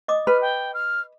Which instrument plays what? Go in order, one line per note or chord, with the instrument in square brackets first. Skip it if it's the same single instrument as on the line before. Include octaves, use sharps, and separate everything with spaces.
[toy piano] D#5 D6 D#6
[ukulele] B4 [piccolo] F6
[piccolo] G5
F6